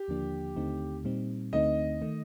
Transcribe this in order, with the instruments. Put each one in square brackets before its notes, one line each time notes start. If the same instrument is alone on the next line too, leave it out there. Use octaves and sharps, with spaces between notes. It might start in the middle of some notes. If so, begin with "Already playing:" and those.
Already playing: [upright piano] G4
[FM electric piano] D#2 D3 F3 A#3 D4
D#2 D3 A3 C4 D#4
A#2 G3 C4 D#4
[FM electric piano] D2 D3 A3 C4 D#4 [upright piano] D#5
[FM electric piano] D#3 A3